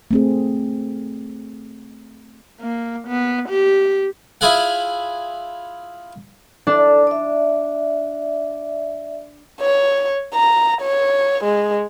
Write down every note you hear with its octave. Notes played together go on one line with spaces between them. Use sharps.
A3 C4 G#4
A#3
B3
G4
E4 F4 G#4 F5 F#5
D4 A4 D5
D5 E5
C#5
A#5
C#5
G#3